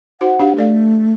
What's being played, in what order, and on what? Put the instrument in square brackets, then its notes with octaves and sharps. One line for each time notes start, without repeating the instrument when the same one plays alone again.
[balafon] D#4 F#4 C5 [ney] F#5
[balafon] D4 G4 F5
[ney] A3 [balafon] A4 D5 F5